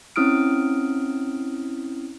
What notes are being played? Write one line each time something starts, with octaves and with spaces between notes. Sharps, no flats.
C4 C#4 E4 D#6 F6 D7